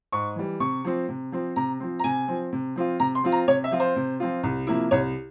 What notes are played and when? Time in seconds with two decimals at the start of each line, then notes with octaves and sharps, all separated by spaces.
0.12 G#2 C#6
0.36 E3 G3
0.60 C3 C#6
0.85 F3 C4
1.09 C3
1.32 F3 C4
1.56 C3 A#5
1.80 F3 C4
1.99 A#5
2.04 C3 G#5
2.28 F3 C4
2.53 C3
2.76 F3 C4 F4
3.00 C3 A#5
3.15 C6
3.23 F3 C4 F4
3.32 A#5
3.48 C3 C#5
3.64 E5
3.71 F3 C4 F4
3.80 C5
3.96 C3
4.20 F3 C4 F4
4.43 C2
4.67 C3 F3 A#3 E4
4.91 C2 C#5